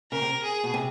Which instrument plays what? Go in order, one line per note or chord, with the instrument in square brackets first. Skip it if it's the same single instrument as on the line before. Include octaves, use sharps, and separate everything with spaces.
[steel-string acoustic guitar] C#3 [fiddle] A#4
[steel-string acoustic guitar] C3
[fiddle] G#4
[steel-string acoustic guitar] B2
C3